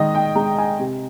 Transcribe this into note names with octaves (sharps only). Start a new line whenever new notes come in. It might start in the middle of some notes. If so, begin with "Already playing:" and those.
Already playing: D#3 G#3 D#5
G5
G#3 A#5
G#5
C3